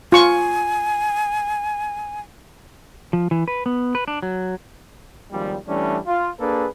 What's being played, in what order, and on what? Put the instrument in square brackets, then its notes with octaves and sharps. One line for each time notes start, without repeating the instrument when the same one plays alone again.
[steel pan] F4 C#6 [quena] G#5
[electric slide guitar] F3
E3
B4
B3
B4
D4
F#3
[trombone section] G#1 D#2 F3 G3
E3 G3 A3 C#4 D4
F4
A#3 D4 G#4 A4 B4